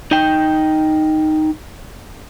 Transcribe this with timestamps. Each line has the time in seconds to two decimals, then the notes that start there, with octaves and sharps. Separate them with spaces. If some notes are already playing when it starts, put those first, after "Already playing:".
0.11 D#4 G5